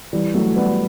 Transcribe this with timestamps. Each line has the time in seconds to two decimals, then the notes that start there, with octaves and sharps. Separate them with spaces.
0.13 E3 G3
0.34 F#3 A3
0.56 G3 B3